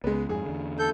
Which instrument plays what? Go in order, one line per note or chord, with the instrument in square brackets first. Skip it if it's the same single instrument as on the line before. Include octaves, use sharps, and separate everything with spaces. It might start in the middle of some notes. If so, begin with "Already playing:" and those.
[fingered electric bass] C#2 [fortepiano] G#3 B3
[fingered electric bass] F2 G#2 [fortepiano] G#4
[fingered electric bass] E2 D3
[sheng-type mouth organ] A4 G6